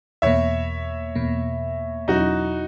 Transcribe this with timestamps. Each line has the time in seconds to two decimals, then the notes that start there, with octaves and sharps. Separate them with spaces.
0.22 E2 B2 A#3 C#5 E5
1.15 E2 B2 A#3
2.08 E2 B2 F#3 C#4 D#4 E4 F#4